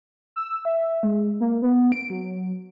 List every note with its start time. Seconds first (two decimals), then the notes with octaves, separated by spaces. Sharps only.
0.36 E6
0.65 E5
1.03 G#3
1.40 A#3
1.62 B3
1.92 D7
2.10 F#3